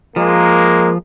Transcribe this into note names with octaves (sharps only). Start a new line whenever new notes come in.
F3 G#3 A#3